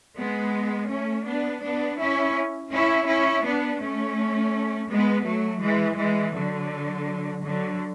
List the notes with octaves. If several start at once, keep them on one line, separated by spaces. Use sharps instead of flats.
G#3 B3
A3 C#4
B3 D4
B3 D4
C#4 E4
C#4 E4
C#4 E4
B3 D4
A3 C#4
G#3 B3
F#3 A3
E3 G#3
E3 G#3
D3 F#3
D3 F#3